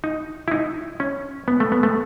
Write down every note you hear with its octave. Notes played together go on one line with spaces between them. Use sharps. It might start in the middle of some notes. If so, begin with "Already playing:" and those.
D#4
E4
D#4
C#4
B3
A3
B3
A3